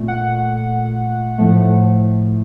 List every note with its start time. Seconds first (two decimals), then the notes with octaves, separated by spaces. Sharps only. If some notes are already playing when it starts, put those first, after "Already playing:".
Already playing: A#2 A3
0.08 F#5
1.38 A2 F3 A3